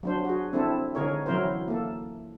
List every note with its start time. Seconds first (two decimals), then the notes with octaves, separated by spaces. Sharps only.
0.03 F#3 D4 C5
0.25 F#4 G#4
0.53 C4 D4 E4 A4
0.95 D3 D#4 G#4 A#4 C#5
1.26 E3 F#3 C#4 E4 A#4 C5
1.68 A#3 A4